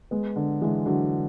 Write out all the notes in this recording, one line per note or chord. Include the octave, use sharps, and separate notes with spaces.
G#3 B3
D3
E3 G#3
D3 F#3